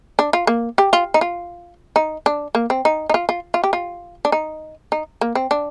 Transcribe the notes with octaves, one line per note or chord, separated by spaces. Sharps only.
D4
F4
A#3
G4
F4
D#4
F4
D#4
D4
A#3
C4
D#4
D#4
F4
F4
F4
G4
F4
D4
D#4
D#4
A#3
C4
D4